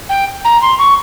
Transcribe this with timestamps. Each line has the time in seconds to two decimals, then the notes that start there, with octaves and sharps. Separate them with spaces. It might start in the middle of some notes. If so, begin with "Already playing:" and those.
0.09 G5
0.45 A#5
0.62 C6
0.78 C#6